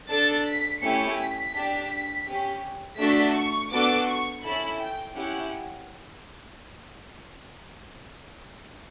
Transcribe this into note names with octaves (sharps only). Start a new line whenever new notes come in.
D4 A4 A6
B6
A3 C#4 E4 G4 C#7
B6
D4 G4
C#4 G4
A3 D4 F#4 A4 B6
C#6
B3 D4 F#4 A4 D6
C#6
C#4 E4 A4 B5
G5
C#4 E4 G4 F#5